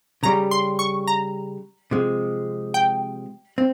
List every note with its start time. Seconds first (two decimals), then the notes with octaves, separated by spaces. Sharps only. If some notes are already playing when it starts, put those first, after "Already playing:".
0.23 C#3 G3 C#4 G4 A#5
0.51 C6
0.79 C#6
1.07 A#5
1.91 C3 F3 G#3
2.74 G5
3.58 C4